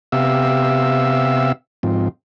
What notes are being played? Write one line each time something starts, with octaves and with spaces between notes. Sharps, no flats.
C3 B3 G4 E5 F5 E6
G#2 F3 C4